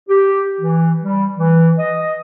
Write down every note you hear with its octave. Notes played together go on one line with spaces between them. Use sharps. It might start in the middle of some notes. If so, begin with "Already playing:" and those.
G4
E3
G3
E3
D#5